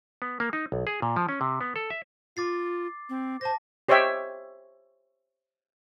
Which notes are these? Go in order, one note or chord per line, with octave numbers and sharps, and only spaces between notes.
B3
A#3
D#4
B1
G#4
A#2
F3
C#4
C3
B3
A4
E5
F4 D6 A6 C7
C4
C5 A5 A#6
G4 C5 C#5 D#5 E5 G5